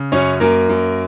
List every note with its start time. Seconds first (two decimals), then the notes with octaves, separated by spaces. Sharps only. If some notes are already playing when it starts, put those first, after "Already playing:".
Already playing: C#3
0.12 F#2 C#4 C#5
0.40 F#2 A#3 A#4
0.69 F#2